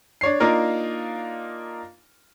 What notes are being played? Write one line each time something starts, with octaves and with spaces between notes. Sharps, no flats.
D4 C#5 C7
A#3 D4 D#4 F4 A#4